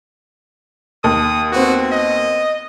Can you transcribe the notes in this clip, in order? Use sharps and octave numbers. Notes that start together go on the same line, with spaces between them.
D#2 D#6
B3 C4 F#4
D#5